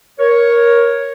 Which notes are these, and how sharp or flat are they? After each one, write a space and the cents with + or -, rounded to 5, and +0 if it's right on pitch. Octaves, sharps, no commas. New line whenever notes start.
A#4 +15 C#5 +0